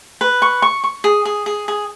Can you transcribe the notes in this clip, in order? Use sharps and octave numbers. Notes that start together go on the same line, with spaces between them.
B4
C#6
C#6
C#6
G#4
G#4
G#4
G#4